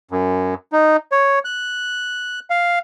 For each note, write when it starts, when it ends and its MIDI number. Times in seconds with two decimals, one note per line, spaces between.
0.11 0.54 42
0.72 0.97 63
1.12 1.39 73
1.45 2.40 90
2.50 2.79 77